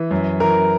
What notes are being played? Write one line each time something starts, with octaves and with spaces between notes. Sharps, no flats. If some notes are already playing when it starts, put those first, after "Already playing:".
Already playing: E3
F#2
E3 A#4